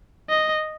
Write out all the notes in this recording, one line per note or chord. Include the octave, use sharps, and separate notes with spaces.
D#5